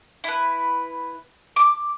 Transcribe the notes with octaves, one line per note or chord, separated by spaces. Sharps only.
E4 B4
D6